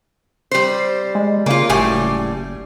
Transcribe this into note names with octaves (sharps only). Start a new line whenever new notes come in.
G3 C5
G#3
C#3 A#3 F4
F#1 A2 G3 G#5